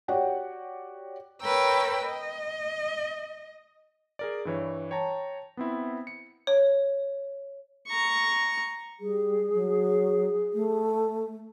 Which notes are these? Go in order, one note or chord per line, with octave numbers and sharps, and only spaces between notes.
F#4 G4 C#5 D5 F#5 G5
A#4 B4 C#5 G5 A#5 E6
D#5
G#4 A#4 D5
G2 E3 C#5
C#5 G5 A5 A#5
B3 C4 E4
C#7
C#5
A#5 C#6
G3 G#4
F#3
A3